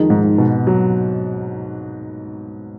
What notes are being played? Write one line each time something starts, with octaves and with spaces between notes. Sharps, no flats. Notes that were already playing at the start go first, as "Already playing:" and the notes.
Already playing: F2 D#3 G#3 D#4
G#2
B2
F#3